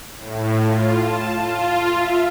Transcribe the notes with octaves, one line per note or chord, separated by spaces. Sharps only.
A2
F4
A5
F4
E5